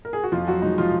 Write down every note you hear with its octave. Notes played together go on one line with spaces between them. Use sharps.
A#4
G#4
F#4
F2 F3 F4
F#3 F#4
F3 G#3 D#4
F3 F4